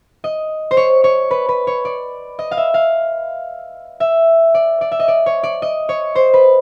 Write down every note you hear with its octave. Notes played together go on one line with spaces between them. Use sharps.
D#5
C5
C#5
C#5
B4
B4
C#5
D5
D#5
F5
E5
F5
E5
D5
D5
E5
D#5
D5
C#5
D5
D#5
C#5
C5
B4